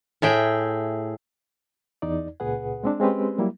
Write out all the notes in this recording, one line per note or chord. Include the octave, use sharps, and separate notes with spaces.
A2 G#4 E5 G5
E2 D#4 D5
C#2 A#2 G#4 B4 F#5
G#3 C4 D4
G#3 C4 C#4 G4 B4
F#3 G3 A#3 E4